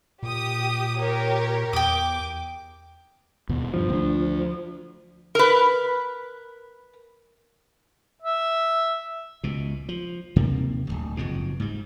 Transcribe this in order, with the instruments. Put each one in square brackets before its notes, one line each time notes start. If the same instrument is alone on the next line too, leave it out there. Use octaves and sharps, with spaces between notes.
[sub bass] A#2 [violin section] G4 D#6
[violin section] G4 A#4 C#5
[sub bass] E2 [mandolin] G5 D#6 [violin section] D6
[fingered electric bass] D#2 B2
[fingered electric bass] G2 [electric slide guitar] F3
[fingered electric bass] D2 D4
[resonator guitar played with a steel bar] A#4 B4
[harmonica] E5
[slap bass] C#2 B2
F3
D#2 C3 D#3 A#3
D1 G#1 D2
F#1 F2 G#2 B2
G#2 G3